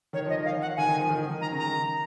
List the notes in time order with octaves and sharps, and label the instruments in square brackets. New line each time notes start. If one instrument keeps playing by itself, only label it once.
[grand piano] D#3 [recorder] C#5
[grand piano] F3 [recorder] D#5
[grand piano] D#3 [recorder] F5
[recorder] F#5
[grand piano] D#3 [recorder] G#5
[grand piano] D#3
F3
D#3
D#3
[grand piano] D#3 [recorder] A#5
[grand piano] C#3
[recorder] A#5
[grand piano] D#3